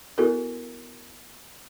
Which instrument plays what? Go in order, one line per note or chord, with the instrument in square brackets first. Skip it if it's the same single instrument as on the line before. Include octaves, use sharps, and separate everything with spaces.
[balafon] B3 E4 F#4 A4 A#4